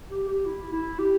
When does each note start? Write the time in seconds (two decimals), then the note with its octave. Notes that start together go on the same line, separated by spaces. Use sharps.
0.11 G4
0.28 G4
0.46 E4
0.73 E4
0.99 G4